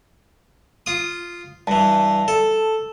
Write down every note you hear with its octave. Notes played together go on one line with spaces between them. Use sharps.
F4 D#6
G2 E3 A5
A4